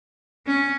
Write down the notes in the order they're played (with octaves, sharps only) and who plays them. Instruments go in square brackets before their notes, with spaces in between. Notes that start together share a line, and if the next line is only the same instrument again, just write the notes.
[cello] C#4